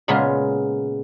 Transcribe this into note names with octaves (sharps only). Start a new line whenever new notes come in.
A#2 C#3 G#3 B3 A#4 C6